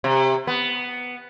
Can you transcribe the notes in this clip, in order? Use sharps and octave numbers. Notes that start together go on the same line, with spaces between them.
C3
B3